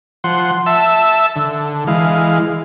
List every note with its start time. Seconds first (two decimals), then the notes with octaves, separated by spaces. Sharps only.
0.24 F3 F#5 C6
0.66 E5 A5 E6
1.36 D3
1.87 E3 G#3 F5